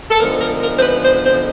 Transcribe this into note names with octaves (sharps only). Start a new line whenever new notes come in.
A4
D3 F3 G#3 B3 D#4 A#4
A#4
A#4
C5
B4
C5
C5